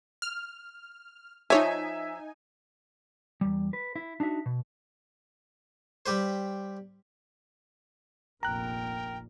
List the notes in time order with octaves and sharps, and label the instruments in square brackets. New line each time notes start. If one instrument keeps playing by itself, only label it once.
[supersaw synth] F6
[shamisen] F3 C#5 [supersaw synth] D#4 G#5 [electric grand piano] E5
[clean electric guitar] E2 G3
B4
E4
D4 D#4 F#4 E5
B2
[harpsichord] G3 G4 B4 C5
[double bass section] F1 A#1 A#2 [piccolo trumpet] A#4 [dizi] G5 [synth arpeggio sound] A#5 F#6